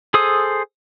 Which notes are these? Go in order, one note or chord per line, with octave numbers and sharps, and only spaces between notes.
G#4 A4 C5 D#6